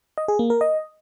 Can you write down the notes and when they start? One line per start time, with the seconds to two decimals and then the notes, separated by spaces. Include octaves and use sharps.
0.18 D#5
0.28 G#4
0.39 A#3
0.50 A#4
0.61 D#5